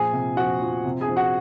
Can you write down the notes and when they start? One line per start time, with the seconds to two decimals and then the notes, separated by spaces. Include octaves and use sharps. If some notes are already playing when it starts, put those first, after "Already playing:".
Already playing: A#2 F3 G#4 G#5
0.13 C3
0.37 F3 F#4 F#5
0.61 F3
0.85 C3
1.01 G#4 G#5
1.08 F3
1.16 F#4 F#5